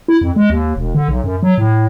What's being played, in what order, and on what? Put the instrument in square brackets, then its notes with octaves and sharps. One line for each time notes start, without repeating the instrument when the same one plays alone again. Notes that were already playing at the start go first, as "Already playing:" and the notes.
[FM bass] E4
F2
G#3
D#2
E1
D3
B1
F#2
F#3
A2